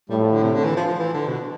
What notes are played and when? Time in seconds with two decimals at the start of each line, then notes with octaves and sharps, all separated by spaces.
0.09 A2 G3
0.21 F3
0.32 D3
0.43 C3
0.55 D3
0.65 E3
0.77 F3
0.87 F3
0.99 E3
1.14 D3
1.28 B2